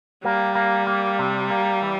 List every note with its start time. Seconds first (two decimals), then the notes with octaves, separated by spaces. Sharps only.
0.24 G3 A#3
0.55 A#3
0.87 A#3
1.19 C3
1.50 A#3
1.82 E3